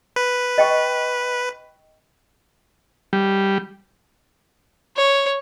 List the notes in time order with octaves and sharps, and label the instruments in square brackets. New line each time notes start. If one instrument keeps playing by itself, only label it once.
[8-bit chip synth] B4
[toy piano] D#5 G5 C#6
[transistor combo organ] G3
[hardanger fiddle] C#5